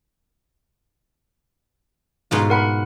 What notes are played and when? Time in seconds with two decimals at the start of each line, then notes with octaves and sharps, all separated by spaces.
2.31 G#2 B2 F4
2.50 A#4 F#5 B5